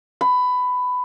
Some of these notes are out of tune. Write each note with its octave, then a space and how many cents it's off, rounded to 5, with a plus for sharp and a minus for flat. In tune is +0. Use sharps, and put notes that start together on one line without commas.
B5 +15